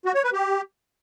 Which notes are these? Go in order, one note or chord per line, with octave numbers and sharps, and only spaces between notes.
F#4
C#5
B4
G4